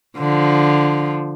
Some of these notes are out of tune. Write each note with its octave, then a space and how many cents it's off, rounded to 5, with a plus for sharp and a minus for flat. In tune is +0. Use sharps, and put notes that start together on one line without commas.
D3 +0 F3 -5